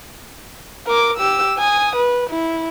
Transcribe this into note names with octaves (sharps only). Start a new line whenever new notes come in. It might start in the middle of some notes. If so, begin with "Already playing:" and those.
A#4 D6
G4 E6
G#5 D#6
B4
E4